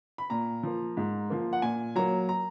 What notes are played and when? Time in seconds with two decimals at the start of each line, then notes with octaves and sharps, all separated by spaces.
0.18 B5
0.30 A#2 A#5
0.63 F3 A#3
0.97 G#2
1.30 F3 A#3
1.53 F#5
1.62 A#2 G#5
1.96 F#3 A#3 A#5
2.29 A#5